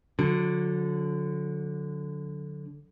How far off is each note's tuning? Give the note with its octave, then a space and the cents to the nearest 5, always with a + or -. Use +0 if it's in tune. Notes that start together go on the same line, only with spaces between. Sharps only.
D3 -10 F#3 -35